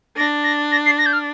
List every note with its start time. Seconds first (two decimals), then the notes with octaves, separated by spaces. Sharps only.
0.17 D4 A#6
0.44 A#6
0.72 A#6
0.86 C7
0.98 A#6
1.06 G6
1.13 F6